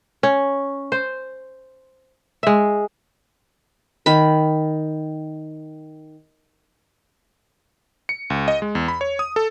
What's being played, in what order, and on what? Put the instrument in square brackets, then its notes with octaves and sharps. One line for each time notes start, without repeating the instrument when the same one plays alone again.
[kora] C#4
C5
G#3 E5
[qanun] D#3 B5
[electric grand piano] C#7
C#2
D#5
G#3
E2
B5
C#5
D#6
A4